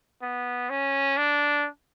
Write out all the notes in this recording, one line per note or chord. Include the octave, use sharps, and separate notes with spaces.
B3
C#4
D4